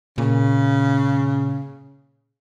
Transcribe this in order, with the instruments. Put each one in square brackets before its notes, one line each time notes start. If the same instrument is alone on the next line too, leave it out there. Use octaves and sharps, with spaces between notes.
[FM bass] A#2 [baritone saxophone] C#3